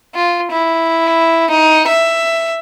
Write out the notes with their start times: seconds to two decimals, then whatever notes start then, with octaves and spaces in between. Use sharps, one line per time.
0.15 F4
0.51 E4
1.50 D#4
1.88 E5